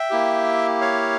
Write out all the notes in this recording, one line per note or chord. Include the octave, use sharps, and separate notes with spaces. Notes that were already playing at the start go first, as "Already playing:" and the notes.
Already playing: E5 G5
A#3 E4 G4
C#5 F5